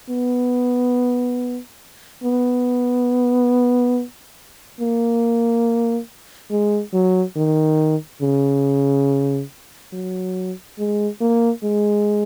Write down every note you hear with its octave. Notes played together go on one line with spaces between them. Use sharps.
B3
B3
A#3
G#3
F#3
D#3
C#3
F#3
G#3
A#3
G#3